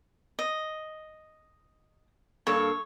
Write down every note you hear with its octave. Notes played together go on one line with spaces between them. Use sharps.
D#5
G2 A#3 A4 C#5